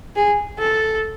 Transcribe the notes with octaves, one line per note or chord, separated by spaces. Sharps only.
G#4
A4